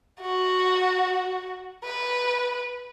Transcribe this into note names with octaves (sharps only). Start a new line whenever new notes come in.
F#4
B4